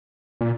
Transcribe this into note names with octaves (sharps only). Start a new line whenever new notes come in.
A#2